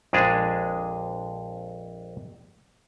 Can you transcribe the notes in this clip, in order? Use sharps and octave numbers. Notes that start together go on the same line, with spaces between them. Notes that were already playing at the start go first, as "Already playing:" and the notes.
A#1 F2 G#3 D4 G#4